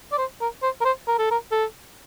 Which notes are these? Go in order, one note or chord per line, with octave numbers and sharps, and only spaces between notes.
D5
C5
A#4
C5
A#4
C5
A#4
A4
A#4
A4